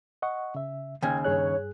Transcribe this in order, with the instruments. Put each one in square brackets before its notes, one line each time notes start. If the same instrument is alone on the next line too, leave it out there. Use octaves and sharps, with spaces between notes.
[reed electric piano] D#5 F#5 C#6
C#3 E5
[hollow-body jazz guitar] D#2 C#3 [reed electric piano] G5 G#6
[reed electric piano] G2 G#4 F#6 [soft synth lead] C#5